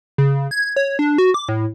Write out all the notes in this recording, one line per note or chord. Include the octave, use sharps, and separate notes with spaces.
C#3
G#6
C#5
D4
F#4
D6
A2